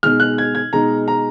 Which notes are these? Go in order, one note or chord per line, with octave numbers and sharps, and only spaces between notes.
B2 G#3 D#4 F6
F#6
G#6
G#6
B2 G#3 D#4 A#5
A#5